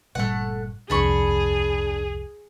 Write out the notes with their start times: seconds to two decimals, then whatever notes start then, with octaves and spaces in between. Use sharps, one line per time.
0.15 G1 A#2 G3 A3 F#5
0.90 D#1 C2 F2 D4 G#4 B5 C#6